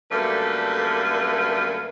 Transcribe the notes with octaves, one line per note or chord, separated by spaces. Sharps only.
F#2 D3 G3 A3 A#3 B4